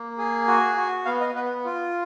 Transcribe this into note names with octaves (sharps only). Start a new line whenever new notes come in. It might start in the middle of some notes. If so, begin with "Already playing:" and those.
Already playing: A#3
G#4
F#4
F#4
B3 F5
D#5
B3 B4
F4